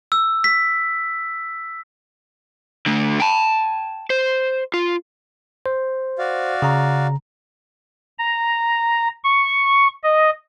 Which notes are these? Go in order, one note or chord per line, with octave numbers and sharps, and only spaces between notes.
E6
B6
D3 A3
G5 A5
C5
F4
C5
F#4 D5 F5
C#3 A#5
A#5
C#6
D#5